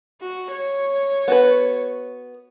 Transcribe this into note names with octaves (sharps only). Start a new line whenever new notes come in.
F#4
C#5
B3 F#4 B4